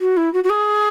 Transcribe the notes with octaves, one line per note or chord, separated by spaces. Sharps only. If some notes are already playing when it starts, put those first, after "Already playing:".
F#4
E4
F#4
F#4
G#4